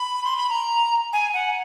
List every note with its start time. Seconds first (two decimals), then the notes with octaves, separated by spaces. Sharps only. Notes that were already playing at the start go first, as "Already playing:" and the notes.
Already playing: B5
0.25 C6
0.37 B5
0.49 A#5
1.13 G#5
1.34 F#5